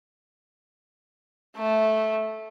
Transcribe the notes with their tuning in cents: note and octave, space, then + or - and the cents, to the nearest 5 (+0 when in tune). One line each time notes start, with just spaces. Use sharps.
A3 -10